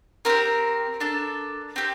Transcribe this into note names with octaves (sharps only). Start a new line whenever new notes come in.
C4 D#4 G4 A#4
D4 A4
C4 G4